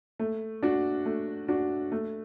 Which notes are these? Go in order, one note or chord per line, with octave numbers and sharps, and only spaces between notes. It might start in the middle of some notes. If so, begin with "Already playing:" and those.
A3
D4 F#4
A3
D4 F#4
A3